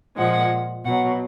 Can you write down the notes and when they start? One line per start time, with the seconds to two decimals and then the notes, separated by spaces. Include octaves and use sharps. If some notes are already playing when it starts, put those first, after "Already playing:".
0.16 A#2 F3 G#3 F#5
0.85 B2 F#3 F#5